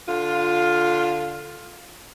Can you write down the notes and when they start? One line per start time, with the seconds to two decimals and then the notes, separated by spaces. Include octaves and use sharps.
0.07 D3 F4